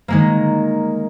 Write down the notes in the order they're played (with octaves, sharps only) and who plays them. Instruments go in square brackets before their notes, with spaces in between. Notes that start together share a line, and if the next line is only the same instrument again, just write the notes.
[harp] D#3 G#3 A#3